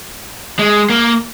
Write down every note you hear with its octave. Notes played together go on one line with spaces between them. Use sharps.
G#3
A#3